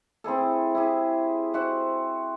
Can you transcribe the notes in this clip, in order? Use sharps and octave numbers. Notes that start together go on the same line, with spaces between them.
C4 E4 G#4 A4
E4 G4 G#4
F#4 C5 E5 F#5